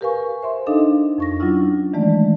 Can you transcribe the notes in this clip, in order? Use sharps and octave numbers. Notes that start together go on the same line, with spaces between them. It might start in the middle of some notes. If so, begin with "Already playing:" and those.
G4 A#4 B4 F5 G#5 C#6
C5 E5 C6
D4 D#4 A4 D#5 F5
F2 C#6 A#6
F#3 C#4 D4 E4 F4
D#3 E3 G#3 A3 D5